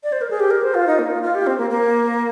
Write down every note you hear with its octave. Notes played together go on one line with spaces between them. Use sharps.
D5
C5
A#4
G#4
G4
A#4
C5
F4
D#4
A#3
F4
F4
G4
C4
A#3
A#3